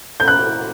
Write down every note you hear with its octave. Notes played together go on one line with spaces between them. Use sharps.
G6
F#6